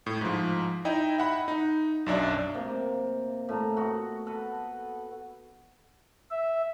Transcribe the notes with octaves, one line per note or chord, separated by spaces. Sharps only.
A2
G#2 F3
D#4 E4 D#5 G5
E5 F#5 B5
D#4
B1 F#2 D4 E5
C3 A#3
A2 A5 A#5
B3 F#4
A4 B4
E5